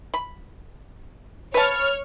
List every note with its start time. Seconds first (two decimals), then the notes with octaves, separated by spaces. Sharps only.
0.14 B5
1.54 B4 C#5 A5 F6